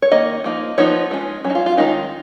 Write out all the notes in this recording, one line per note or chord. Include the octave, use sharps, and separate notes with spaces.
C#5
D#3 A#3 D#5
F3 A#3 D#4
F3 B3 D#4 C#5
G#3 C#4
F#3 C#4
D#4
F4
F4
D#3 G#3 C#4 D#4